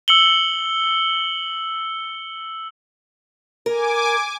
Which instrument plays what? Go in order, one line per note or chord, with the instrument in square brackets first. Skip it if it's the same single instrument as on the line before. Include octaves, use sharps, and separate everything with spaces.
[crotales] E6 C#7 F#7 G7
[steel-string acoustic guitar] A#4 [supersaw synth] G#5 D6